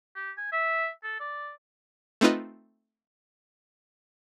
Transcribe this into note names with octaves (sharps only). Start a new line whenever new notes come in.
G4
G#5
E5
A4
D5
A3 C4 D#4 F4 B4 D#5